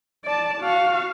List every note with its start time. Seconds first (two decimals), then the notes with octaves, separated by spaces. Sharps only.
0.25 D5 A5
0.61 F#4 F5